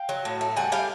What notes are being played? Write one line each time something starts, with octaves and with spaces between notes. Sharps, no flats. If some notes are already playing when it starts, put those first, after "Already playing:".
Already playing: F5 G5
F#3
A2
A3
G3 F#5 G#5
G3 F5 G5